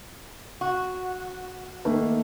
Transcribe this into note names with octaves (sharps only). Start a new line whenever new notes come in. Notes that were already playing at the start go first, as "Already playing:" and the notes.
F#4
D#3 A3 A#3